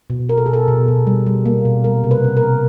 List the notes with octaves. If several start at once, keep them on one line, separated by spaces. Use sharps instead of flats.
B2
B2 A#4
A4
B2 G#4
A4
B2
B2
G3
G3
A#3
B2
G3 A#4
C3
B4
C3
A#4
C3